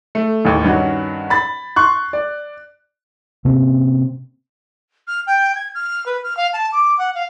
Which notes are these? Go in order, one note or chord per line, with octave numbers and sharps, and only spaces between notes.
A3
A1 D#2
G2 D#3 C#4 F#4
B5 A6
C6 C#6 F#6
D5
C3 A#3 C4 C#4
F6
G5
G#6
F6
B4
F6
F5
A5
D6
F#5
F5